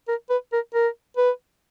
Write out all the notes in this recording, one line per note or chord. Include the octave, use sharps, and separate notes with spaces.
A#4
B4
A#4
A#4
B4